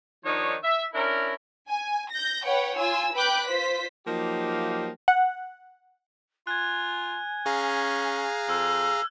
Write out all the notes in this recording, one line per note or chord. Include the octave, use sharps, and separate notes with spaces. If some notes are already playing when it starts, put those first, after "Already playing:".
D#3 F3 D4 D#4 C#5
E5
C#4 D4 E4 A#4
G#5
G6 A#6
B4 C#5 F#5 G5
F4 G#5 E6
B4 G5 B5 D6 F#6 G6
F4 C5 B6
F3 F#3 A#3 D#4 G4
F#5
F4 G#5 F#6 G#6
C#4 G#4 F5 A#5
F2 E6 F6